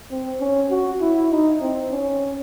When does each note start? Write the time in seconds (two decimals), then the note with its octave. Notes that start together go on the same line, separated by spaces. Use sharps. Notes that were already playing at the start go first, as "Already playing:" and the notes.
0.10 C4
0.40 C#4
0.70 F#4
1.00 E4
1.31 D#4
1.61 C4
1.91 C#4